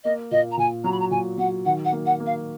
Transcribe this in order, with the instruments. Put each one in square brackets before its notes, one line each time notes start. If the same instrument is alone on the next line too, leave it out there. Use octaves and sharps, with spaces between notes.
[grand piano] A#3 [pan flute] D#5
[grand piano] A#2 [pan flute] D#5
[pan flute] A#5
[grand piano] A#2 [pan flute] G#5
[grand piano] F#3 [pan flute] A#5
[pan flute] B5
A#5
[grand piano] A#2 [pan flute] G#5
[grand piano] F#3 [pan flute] F#5
[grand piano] D#3 [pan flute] F#5
[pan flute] F#5
[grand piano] A#3
[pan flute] F#5
[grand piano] A#3
[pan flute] F5